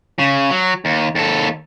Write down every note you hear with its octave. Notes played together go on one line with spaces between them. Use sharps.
C#3
F#3
D#2
D#2 A4